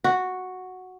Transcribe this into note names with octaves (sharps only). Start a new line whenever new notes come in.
F#4